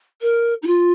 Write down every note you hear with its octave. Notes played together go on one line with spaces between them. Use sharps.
A#4
D#4
F4